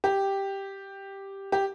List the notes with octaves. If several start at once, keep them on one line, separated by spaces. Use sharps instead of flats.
G4
G4